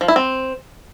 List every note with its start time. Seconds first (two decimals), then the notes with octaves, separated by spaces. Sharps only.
0.01 F3
0.08 E4
0.16 C4